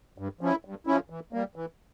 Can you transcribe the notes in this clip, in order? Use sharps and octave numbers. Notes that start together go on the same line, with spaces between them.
G2
F3 C#4 E4
G2
F3 C#4 E4
E3
G3 A#3
E3